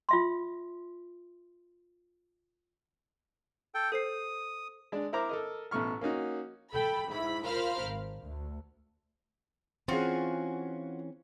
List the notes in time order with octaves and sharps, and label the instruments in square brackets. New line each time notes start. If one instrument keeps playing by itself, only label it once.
[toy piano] F4 E5 C6
[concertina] A4 G5
[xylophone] A4 C5 C7 [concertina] D#6
[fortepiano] G#3 D4
E4 A#4 C5 A#5 D6
A4 A#4 D#5
A1 B2 A3 C#6 F6
A#3 C#4 D#4 F#4
[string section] A4 G5 B5
G#2 E4 B5
F4 A#4 C5 F5 B5 F6
G#1
D2
[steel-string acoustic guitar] E3 C#4 G#4 [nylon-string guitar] C4 [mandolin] F4 F#4